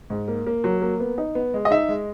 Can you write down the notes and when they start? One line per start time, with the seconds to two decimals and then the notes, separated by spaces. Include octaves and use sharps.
0.10 G#2
0.28 A#3
0.47 A#3
0.64 F#3
0.82 A#3
1.00 B3
1.18 D#4
1.35 B3
1.54 G#3
1.65 D#5
1.71 D#4 E5
1.89 G#3